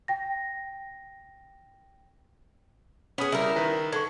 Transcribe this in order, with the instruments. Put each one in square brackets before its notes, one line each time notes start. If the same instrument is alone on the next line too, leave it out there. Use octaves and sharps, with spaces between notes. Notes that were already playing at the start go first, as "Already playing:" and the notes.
[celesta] G5 A#6
[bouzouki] B3 G#4 [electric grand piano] C#4 B5 D#6
[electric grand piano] C#3 G3 [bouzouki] E4 A#4
[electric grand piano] D#3 B4 A#5
[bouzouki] D3 [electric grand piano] C#6 G#6